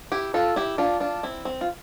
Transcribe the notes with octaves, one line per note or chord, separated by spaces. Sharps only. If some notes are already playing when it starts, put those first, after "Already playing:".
E4 G4
F4 A4
E4 G4
D4 F4
D4 F4
C4 E4
C4
F4